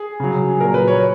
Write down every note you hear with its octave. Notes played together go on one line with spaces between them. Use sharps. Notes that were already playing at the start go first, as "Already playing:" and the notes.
Already playing: G#4
C#3 F#3
A#2 F#3 A#4
B4
C#5